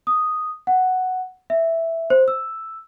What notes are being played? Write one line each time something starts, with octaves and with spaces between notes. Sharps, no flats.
D#6
F#5
E5
C5
E6